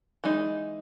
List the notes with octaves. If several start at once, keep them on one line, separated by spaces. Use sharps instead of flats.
E3 G#3 D#4